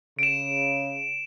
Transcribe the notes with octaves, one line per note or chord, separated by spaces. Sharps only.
C#3 D7 E7